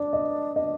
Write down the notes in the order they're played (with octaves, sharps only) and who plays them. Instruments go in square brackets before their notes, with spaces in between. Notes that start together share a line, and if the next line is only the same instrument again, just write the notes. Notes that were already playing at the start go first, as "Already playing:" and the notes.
Already playing: [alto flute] D4 [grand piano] D5
[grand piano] D#5
[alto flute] D4 [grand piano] D#5